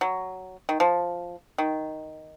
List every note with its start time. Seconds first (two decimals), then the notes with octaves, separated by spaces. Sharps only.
0.01 F#3
0.69 D#3
0.80 F3
1.58 D#3